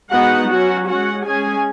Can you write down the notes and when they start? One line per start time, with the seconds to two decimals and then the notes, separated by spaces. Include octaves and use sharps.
0.12 G#3 B3 D#4 F#4 F#5
0.50 F#3 C#4 F#4 F#5
0.88 G#3 C#4 F#4 F#5
1.26 G#3 C#4 G#4 G#5